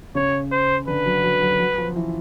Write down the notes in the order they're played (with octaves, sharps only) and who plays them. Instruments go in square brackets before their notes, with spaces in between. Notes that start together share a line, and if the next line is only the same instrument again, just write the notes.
[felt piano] C#3 [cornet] C#5
[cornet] C5
[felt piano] D3 [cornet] B4
[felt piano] F#3
F#3
F#3
F#3
F3
E3